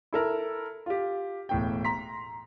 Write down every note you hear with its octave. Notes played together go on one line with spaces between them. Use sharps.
E4 A4 A#4
F4 G4
E1 A2 G5
A#5 C6 B6